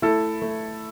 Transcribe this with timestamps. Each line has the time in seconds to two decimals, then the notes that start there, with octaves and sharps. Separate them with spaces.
0.02 A3 E4 A4
0.42 A3